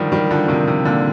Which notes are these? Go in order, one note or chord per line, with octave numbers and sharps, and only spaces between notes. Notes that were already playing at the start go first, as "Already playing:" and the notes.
Already playing: D3 D#3 F3 G3
D#3 G3
D3 F3
C3 D#3
C3
A#2 D3